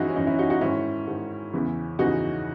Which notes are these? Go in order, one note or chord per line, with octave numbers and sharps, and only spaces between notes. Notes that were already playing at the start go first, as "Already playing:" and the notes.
Already playing: F#2 E3 D#4 E4 F#4 G#4
C#4
F#2 E3 D#4
C#4 E4
D#4 F#4
D#4 F#4
G#2 D#3 C#4 E4
G#2 D#3
E2 C#3 E3
E2 C#3 E3 D#4 F#4